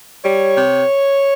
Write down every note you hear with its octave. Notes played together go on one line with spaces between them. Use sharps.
G3 C#5
C3